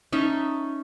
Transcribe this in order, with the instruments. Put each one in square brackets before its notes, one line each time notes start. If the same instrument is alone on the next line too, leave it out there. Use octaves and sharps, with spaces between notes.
[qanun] C#4 D#4 E5 A5